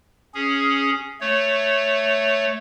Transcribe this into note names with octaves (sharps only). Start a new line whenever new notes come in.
C#4 G#4
A3 C#5